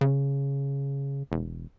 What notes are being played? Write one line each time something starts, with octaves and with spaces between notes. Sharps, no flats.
C#3
E1